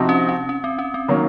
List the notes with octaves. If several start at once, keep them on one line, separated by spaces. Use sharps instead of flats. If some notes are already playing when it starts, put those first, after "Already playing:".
Already playing: C3 F3 C4 D#4 F#4
C#4
C#4
C#4
C4
C#4
C4
D#3 F#3 A#3 C#4